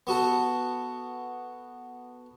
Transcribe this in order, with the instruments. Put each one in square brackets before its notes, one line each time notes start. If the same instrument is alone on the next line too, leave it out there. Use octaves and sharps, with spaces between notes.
[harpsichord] B3 F#4 A4